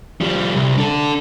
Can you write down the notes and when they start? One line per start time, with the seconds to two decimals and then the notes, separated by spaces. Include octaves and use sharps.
0.21 F3 G3
0.55 C2
0.78 D4 A4